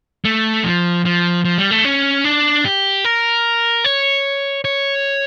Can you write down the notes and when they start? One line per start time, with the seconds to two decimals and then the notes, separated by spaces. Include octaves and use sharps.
0.25 A3
0.64 F3
1.05 F3
1.45 F3
1.58 G3
1.71 A3
1.85 C#4
2.24 D4
2.65 G4
3.05 A#4
3.85 C#5
4.65 C#5